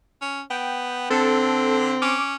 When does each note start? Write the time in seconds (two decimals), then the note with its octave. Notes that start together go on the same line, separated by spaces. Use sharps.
0.22 C#4
0.50 B3 G5
1.10 D3 C4 A4
2.02 C#4 D6